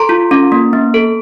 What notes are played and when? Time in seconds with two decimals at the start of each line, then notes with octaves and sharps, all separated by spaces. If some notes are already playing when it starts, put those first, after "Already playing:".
Already playing: A4 A#5 C6
0.09 F4
0.31 C#4
0.52 A#3
0.73 B3
0.94 A4